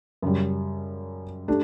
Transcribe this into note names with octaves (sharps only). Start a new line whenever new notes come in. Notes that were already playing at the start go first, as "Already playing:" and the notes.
F#2 C#3 G3
A3 D4 G4